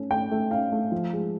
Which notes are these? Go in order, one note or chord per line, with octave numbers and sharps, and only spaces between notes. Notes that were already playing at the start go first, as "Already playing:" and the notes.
Already playing: A3 C#4
A3 G5
A3
C#4 F5
A3
F3
G#3